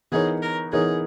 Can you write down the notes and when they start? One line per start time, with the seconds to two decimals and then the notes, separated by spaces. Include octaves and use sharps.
0.12 E3 B3 D#4 G#4 A#4 C#5
0.42 A#4
0.73 E3 B3 D#4 G#4 A#4 C#5